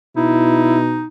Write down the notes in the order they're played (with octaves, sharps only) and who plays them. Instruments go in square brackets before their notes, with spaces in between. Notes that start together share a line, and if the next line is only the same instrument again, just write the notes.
[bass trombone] B2 [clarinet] D#4 [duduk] E4